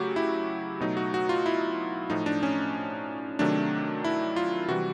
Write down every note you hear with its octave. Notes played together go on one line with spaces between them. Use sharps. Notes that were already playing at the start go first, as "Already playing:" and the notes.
Already playing: C#3 F#3 A3 F#4 G4
E4
B2 F#3 A3 D#4
F#4
F#4
F4
E4
A2 F3 A3 D#4
D4
C#4
C3 D#3 F#3 A3 D4
E4
F4
C3 E3 G3 F#4